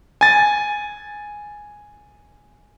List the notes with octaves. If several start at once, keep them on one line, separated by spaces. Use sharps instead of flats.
G#5 A6